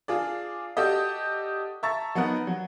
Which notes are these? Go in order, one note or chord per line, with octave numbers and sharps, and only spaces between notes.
D4 F4 G#4 D5
F#4 G4 A4 D5 D#5
E5 A5 A#5 C#6 A6
F#3 B3 D#4 A#4 F#5
F#3